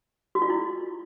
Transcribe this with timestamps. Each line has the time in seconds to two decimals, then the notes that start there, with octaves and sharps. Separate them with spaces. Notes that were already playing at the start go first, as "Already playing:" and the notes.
0.35 F#4
0.42 F4
0.50 E4